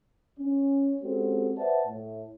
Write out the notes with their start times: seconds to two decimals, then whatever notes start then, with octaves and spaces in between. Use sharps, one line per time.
0.38 C#4
1.02 G#3 C4 C#4 F#4 G4 A4
1.56 B4 C5 D5 E5 F#5 A5
1.87 A2